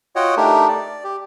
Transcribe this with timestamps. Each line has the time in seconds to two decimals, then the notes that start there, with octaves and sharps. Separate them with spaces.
0.16 F4 F#4 C#5 D#5 F#5 G5
0.37 A3 D4 D#4 G4 A#4
0.68 D5
1.04 G4